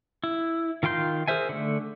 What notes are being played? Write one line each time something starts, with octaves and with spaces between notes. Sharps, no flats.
E4
D#3 F4 G5 C6 G6
G#4 A#4 C5 E5 G#5
D3 A3